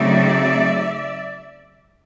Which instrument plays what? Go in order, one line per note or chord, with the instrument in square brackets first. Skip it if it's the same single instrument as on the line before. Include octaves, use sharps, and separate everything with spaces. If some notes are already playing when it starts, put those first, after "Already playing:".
Already playing: [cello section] C#3 F#3 A3 C4 D#4 D5 E5